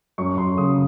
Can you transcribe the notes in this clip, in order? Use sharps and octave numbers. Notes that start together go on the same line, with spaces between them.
F#2 C#6
F#2 C6
C#3 D#6